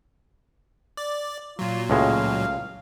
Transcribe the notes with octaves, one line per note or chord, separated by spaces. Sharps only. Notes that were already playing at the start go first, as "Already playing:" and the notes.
D5
A#2 F#3 F4
C#2 A2 G#3 F5